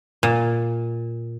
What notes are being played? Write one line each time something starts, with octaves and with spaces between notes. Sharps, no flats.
A#2